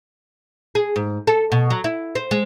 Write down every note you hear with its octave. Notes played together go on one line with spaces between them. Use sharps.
G#4
G#2
A4
B2
F#3
E4
C5
G#3